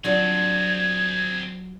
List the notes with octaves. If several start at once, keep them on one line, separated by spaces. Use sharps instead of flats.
F#3 C4 D4 F4 G#4 G#6